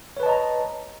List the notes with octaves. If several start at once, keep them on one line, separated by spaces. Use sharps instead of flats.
B4 C#5 D#5 A5 A#5